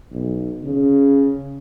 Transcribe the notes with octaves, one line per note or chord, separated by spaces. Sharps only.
B1
C#3